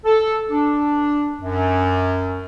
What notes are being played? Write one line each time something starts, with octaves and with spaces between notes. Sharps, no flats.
A4
D4
F#2